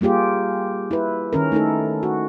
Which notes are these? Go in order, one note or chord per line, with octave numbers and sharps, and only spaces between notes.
G3 A#3 F4 G4 G#4
E4 B4
D#3 C#4 A#4
A3 D#4 E4 A4
F#4